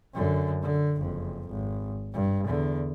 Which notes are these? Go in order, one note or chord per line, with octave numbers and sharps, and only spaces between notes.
F#2 D3
D3
F#1 F2
G#1
G2
E2 D3